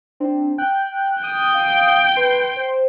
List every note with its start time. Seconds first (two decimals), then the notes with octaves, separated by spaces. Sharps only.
0.20 C4 D4
0.58 G5 F#6
1.24 G5 D#6
1.54 F5
2.17 B4 C6
2.56 C5